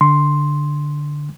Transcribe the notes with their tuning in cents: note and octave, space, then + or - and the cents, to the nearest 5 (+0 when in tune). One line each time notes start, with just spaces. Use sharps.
D3 +0 C6 +0